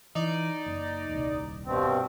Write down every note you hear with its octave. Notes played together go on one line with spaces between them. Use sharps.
E3 D#4 D5
F#1
D#1 C2
G2 B2 C4